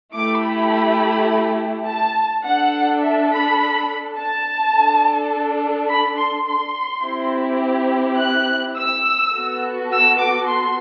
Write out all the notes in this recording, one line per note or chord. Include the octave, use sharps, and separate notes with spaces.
A3 E4 G4 D6
B5
A5
D4 A4 F#5
E5
B5
A5
D4 A4
B5
C6
C6
C4 E4 G4
F#6
E6
B3 F#4 A4
E6
D6
C6